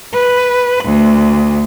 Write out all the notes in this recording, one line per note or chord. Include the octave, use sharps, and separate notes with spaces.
B4
D2